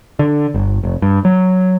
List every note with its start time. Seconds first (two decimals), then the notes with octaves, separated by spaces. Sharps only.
0.19 D3
0.54 G1
0.83 F1
1.02 G2
1.25 F#3